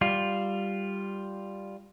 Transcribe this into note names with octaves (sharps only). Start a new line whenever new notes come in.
G3 F4